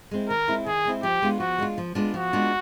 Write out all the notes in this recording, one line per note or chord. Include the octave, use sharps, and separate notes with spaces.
G#3 C4 E4
D#3 A#4
G#3 C4 E4
D#3 G#4
G#3 C4 E4
F3 G4
G#3 B3 D4 F4
F3 F#4
G#3 B3 D4 F4
F3
G#3 B3 D4 F4
F3 F#4
G#3 B3 D4 F4